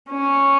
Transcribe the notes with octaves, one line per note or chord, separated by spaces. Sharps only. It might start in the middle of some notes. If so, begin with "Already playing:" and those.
C#4